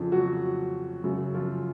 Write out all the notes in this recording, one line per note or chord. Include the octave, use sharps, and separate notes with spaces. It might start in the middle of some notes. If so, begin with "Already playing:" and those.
Already playing: F2 C#3 F3
F#3 F#4
F#2 C#3 F#3
F3 F4